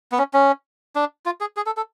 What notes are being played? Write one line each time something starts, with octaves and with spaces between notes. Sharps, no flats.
B3
C#4
C#4
D4
F4
G#4
G#4
A4
A4